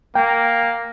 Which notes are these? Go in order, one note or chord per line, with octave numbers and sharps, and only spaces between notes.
A#3 G5